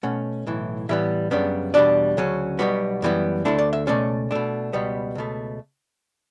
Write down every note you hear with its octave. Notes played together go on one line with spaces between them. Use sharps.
B2 A3 C#4 F#5
B1 A2 E3
A2 E3 G3 B3 E5
F#2 C#3 G3 B3 D4
E2 B2 G3 D4 D5
D2 C#3 F#3 C#4
B1 B2 G3 B3 F#4
F#2 E3 G3 B3
D2 D3 A3 D4 E4
D5
E5
C#2 B2 A3 C#4 D5
B2 A3 D4
C#2 B2 G3 B3
C#2 B2 A3